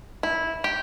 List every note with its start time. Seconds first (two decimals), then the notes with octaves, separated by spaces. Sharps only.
0.23 E4
0.64 G4